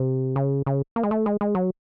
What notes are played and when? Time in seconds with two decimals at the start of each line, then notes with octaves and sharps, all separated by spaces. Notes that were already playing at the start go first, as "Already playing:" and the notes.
Already playing: C3
0.36 C#3
0.66 C#3
0.96 A#3
1.03 G#3
1.11 A3
1.26 G#3
1.41 G#3
1.55 F#3